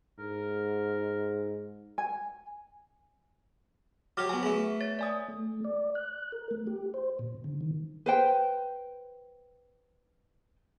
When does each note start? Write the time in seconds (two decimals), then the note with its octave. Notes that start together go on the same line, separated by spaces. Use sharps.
0.19 G#2 A#4
1.98 G#5
4.17 F#3 G4 C#5 D6 F6
4.29 F#3 B3 G#5
4.43 A3 B3 G#4
4.81 C#5 A6
4.99 D5 G#5 D#6
5.28 A3
5.65 D5
5.95 F#6
6.32 A#4
6.51 A3
6.67 G4
6.94 C5
7.19 A#2
7.44 D3
7.61 D#3
8.06 B4 C5 G5